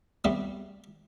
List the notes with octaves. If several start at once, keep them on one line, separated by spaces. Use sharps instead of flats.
G3 A3 B3 C4 F#4 D5